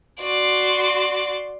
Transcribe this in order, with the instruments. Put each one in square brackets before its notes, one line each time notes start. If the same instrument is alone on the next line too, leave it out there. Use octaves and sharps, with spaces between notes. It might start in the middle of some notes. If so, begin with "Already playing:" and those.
[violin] F#4 C6 [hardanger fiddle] D5